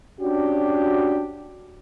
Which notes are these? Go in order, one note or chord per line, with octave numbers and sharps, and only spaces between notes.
C#4 D4 F#4 G4